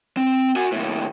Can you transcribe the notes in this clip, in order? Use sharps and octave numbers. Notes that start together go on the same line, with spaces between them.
C4
F#4 G#5
D#2 A2